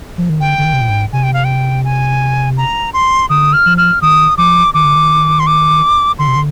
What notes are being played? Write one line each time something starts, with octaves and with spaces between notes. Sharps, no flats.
F3
D#3
D3 G5
D3
D#3
C3
A#2
G#2
C3 G#5
G5
F5
G5
G#5
A#5
C6
D3 D#6
F6
F3
F6
D#3 D#6
F3 D6
D#3 D6
D3
D#3
C6
D6
D3 C6
C3
D3